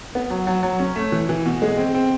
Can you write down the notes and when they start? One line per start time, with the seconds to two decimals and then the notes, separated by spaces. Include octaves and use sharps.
0.15 B3
0.30 F#3
0.47 F#3
0.63 F#3
0.80 C#4
0.96 A3
1.12 E3
1.29 E3
1.45 B2
1.62 G#3
1.78 C4
1.94 C4